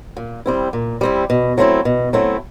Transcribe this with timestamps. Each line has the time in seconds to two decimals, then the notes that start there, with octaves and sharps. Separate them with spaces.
0.17 A#2
0.46 G3 C4 E4
0.73 A#2
1.01 G3 C4 E4
1.30 B2
1.58 F#3 A3 C4 E4
1.85 B2
2.13 F#3 A3 C4 E4